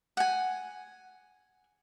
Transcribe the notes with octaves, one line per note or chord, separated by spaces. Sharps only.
F#5 G#5